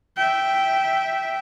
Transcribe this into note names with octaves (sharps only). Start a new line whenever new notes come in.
E5 G5